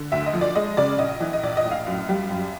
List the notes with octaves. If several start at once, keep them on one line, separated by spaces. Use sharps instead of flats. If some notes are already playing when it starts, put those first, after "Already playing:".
Already playing: D3
D2 E5
D#5
F3
D5
G#3 D#5
C#3 D5
A#1 D#5
E3
D#5
A#1 D5
D#5
A2
F5
F#2
G3
F#2